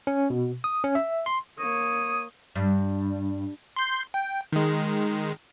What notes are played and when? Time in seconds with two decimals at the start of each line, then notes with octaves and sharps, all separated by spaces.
0.07 C#4
0.30 B2
0.64 D#6
0.84 C#4
0.95 E5
1.26 C6
1.59 A#3 C#5 D#6
2.56 G2
3.76 C6 G6
4.14 G5
4.53 D#3 G#3